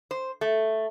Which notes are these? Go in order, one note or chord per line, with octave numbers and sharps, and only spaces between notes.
C5
A3